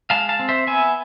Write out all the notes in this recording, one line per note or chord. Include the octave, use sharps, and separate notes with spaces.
G#3 F5 A5
F5 A5
C4
C5 E5
B3 E5 G#5